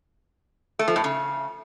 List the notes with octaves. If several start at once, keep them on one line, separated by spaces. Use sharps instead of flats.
A3
F3
A2
C#3